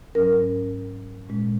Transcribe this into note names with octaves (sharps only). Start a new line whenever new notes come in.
G#2 F#3 C#4 A#4
A#2 G#3 C#4